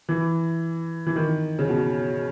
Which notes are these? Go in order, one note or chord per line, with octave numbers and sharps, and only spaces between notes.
E3
E3
D#3
C#3
B2